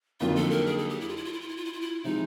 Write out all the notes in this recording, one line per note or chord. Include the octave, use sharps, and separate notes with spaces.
F2 D3 F#3 A#3 D#4 F4
A4
A#4
G#4
A4
G4
E4
F4
E4
F4
E4
F4
E4
F4
E4
F4
E4
C3 F3 G#3 D#4